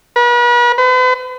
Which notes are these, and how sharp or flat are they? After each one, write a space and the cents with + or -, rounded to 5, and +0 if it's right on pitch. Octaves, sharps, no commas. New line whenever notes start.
B4 -40
B4 +45